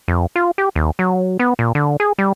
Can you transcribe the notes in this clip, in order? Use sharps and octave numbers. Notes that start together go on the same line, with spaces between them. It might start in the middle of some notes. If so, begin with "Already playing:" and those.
F2
F4
G4
D#2
F#3
B3
A#2
D3
G#4
G3